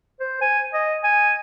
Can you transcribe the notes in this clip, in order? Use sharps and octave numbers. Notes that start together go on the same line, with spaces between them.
C5
G#5
D#5
G#5